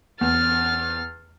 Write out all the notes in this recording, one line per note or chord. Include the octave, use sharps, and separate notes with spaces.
E2 F6 A6